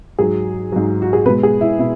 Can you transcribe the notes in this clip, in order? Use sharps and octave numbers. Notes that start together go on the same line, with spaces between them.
G#2 F#3 G#4
G#2 F#3
F#4
G#4
B2 G#3 B4
G#4
E4
B2 E4